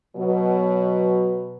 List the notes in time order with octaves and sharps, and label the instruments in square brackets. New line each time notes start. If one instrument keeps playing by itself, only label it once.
[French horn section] B2 F#3